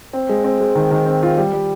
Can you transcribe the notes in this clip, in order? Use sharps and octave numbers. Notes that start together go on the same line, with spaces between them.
C4
G#3
C4
G#3
D#3
D#3
C4
F4
G3
G3